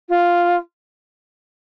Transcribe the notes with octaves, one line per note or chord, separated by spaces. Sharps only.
F4